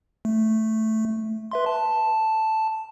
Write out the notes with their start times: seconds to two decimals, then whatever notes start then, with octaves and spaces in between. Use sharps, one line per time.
0.25 A3
1.51 B4 E5 C6
1.66 A5